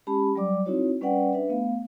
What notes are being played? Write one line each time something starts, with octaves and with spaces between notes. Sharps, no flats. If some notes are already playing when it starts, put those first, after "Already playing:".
G#3 C#4 G4 A5 B5
F#3 G3 D5 D6
C4 D#4 E4 F#4 C#5
G3 C#4 B4 D5 F#5 G5
D4 B4 E5
A3 B3 F5